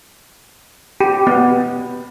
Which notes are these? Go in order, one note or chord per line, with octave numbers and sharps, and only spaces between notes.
G4
B3